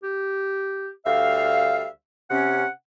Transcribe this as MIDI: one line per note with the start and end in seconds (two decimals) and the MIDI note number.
0.03 0.89 67
1.06 1.87 38
1.06 1.87 55
1.06 1.90 76
1.06 1.87 77
2.30 2.64 48
2.30 2.64 61
2.30 2.69 78